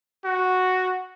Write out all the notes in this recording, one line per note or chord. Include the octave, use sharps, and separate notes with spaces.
F#4